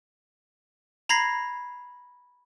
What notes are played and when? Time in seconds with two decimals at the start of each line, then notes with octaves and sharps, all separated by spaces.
1.09 A#5 B5 G#6 A#6 C7